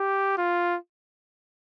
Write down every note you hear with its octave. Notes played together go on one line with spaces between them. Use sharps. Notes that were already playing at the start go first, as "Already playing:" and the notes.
Already playing: G4
F4